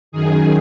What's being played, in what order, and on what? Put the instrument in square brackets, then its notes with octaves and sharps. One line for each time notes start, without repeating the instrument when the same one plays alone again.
[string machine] F#2 D#3 G#4